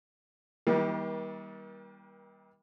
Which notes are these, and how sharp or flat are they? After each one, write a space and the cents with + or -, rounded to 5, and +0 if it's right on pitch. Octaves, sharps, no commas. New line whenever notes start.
D#3 +45 G3 +0 A#3 +40